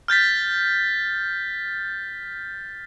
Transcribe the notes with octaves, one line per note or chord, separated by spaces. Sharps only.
F6 G6 A6 B6